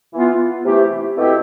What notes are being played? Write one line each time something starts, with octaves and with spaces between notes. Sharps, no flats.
E3 B3 F4
C3 E3 A3 E4 G4
B2 A3 C4 E4 G4